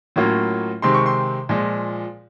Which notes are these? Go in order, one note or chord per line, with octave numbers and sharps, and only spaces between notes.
A2 F#3 A#3 C#4 F4
C3 D#3 G#3 C4 C6
C#6
C6
A#2 F3 G#3